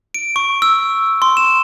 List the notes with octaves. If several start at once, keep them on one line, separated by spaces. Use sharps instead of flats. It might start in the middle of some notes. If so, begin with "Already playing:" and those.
D7
C#6
E6
C6
E7